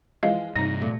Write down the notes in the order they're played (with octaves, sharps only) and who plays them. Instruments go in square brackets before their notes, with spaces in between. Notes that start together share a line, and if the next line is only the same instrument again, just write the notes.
[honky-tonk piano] E3 F3 G#3 [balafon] D#5 F5
[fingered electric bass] G2 C3 [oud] D#4 [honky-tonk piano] A#6
[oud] A#2 [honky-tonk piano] A3